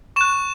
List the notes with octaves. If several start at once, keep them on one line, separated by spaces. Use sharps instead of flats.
C#6 F#6 E7